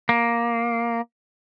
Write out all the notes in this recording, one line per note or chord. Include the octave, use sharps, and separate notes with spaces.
A#3